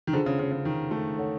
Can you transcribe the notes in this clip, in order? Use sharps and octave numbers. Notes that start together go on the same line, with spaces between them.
D#3
D3 D4 F4 G#4 C5
C#3
C#3
C#3
D#3
A3
A4 C#5 F#5